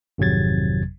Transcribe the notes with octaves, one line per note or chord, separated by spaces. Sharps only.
G#1 F2 C3 F#3 G#6 A6